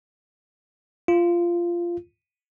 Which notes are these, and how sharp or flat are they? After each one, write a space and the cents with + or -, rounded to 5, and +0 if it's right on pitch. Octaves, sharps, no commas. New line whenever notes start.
F4 -15